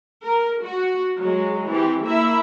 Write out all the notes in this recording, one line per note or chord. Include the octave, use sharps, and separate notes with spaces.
A#4
F#4
F#3 G#3
E3 C4 G4
A#3 E4 E5